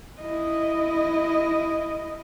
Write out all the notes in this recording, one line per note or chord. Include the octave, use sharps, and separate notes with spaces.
E4 D#5